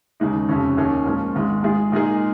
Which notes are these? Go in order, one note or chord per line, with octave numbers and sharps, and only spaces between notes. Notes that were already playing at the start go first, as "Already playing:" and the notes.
D#2 C#3 G#3 D#4
F1 F2 C#3 F3 C#4
D#2 D#3 C#4 G#4
A#2 F3 G#3 C#4
G#1 G#2 G#3
G#2 G#3 F4 G#4
A#2 G#3 D#4 G#4